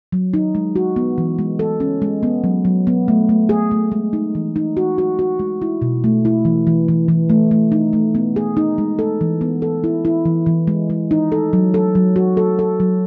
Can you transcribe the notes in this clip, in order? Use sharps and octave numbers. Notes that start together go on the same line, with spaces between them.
F#3
D#4
G#3
F#4
B3
E3
G#3
A4
C#4
G#3
B3
F#3
F#3
B3
A3
A3
G#4
A3
G#3
D#4
E3
D#4
F#4
F#4
F#4
G#3
E4
B2
A3
E4
E3
E3
E3
E3
A3
A3
D#4
A3
B3
G#4
D#4
G#3
A4
E3
B3
A4
E4
E4
E3
E3
G#3
G#3
D#4
A4
F#3
A4
F#3
F#4
A4
A4
F#3